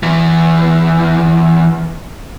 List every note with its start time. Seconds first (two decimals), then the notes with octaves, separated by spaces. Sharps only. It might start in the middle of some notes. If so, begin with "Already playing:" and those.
0.03 E2 E3